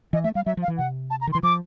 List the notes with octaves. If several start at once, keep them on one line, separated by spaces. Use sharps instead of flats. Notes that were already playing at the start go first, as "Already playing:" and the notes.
E3 D#5
A3 E5
G3 F5
F#3 E5
F3
F5
E3
C3 F#5
A5
A#5
D#3
E3 C6
F3 D6